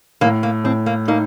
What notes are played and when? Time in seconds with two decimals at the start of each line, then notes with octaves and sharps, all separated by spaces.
0.21 A2 A#3
0.43 A#3
0.64 A2 C4
0.86 A#3
1.08 A#3 D#4